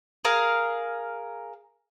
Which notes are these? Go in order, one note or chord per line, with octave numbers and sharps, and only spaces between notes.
G#4 A#4 F5